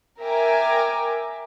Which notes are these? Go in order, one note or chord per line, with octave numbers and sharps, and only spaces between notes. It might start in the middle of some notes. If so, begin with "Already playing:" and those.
A#4 E5 G5 G#5 A#5 D6